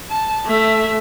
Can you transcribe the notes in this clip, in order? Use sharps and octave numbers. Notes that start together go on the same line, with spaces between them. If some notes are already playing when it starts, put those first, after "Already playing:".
A5
A3 E5